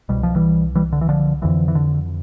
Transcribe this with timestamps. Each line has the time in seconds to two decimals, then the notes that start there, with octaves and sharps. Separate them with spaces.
0.09 C2 B2 G3
0.23 F3
0.36 E3 G3
0.75 E3 G3
0.93 D3
1.01 E3
1.09 D3 F3
1.42 F2 D3 E3
1.68 E3
1.75 D3